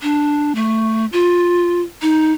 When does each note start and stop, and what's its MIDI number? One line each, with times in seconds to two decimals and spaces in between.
0.02 0.55 62
0.55 1.06 57
1.12 1.81 65
2.02 2.32 63